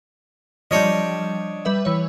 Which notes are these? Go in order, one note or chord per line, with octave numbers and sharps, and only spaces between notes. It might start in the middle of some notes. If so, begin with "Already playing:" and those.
F3 G3 D4 C#5 D#5
G3 B4 E5
E3 C#5